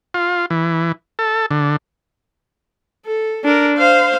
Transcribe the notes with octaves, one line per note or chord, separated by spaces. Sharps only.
F4
E3
A4
D3
A4
D4 A#4
C5 F5